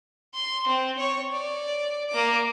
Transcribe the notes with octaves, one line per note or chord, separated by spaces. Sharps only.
C6
C4
C#5 C#6
D5
A#3 D6